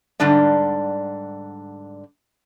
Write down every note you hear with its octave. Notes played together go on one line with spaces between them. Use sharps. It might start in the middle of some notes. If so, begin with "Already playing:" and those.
G#2 D3 G3 D4 D5